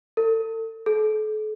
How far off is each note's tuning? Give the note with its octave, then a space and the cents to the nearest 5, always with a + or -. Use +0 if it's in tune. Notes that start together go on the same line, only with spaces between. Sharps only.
A4 +35
A4 -40